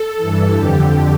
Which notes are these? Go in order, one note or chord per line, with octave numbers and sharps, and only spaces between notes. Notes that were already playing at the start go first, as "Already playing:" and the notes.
Already playing: A4
G2 E3
F2 D3 G4